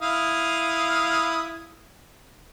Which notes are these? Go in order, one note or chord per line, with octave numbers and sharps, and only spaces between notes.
E4 F5 D#6